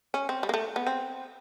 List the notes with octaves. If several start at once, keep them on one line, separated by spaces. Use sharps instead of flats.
C#4
C4
G3
A#3
A3
B3
C4